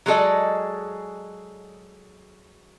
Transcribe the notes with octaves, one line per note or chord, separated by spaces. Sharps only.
F#3 G#3 G#4 A4 D5 D#5